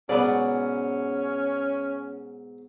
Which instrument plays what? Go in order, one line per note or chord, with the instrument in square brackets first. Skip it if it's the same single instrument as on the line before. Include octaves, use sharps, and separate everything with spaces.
[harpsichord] G#2 B2 F#3 [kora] B3 D5 [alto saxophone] C#4